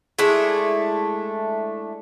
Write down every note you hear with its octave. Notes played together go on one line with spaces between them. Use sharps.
G#3 A3 D4 E4